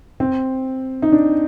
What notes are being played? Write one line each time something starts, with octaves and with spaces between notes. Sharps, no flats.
C4
D#4
D4